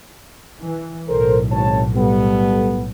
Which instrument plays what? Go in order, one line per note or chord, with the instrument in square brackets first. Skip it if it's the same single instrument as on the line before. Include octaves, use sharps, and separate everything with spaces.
[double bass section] E3
[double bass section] B1 A2 [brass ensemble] A4 A#4 C5
[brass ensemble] G#1 C#5 A5
G3 B3 A4